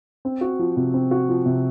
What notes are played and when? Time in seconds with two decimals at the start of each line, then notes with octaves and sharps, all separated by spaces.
0.25 C4
0.41 F#4
0.59 F3
0.77 C3
0.94 C4
1.11 F#4
1.29 F3
1.46 C3